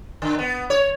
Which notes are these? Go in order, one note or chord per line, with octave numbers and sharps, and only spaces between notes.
D3
B3
C#5